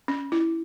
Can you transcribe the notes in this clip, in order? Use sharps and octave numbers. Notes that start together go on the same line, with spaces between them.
C#4
E4